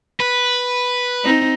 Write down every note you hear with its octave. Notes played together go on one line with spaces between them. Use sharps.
B4
C4 D#4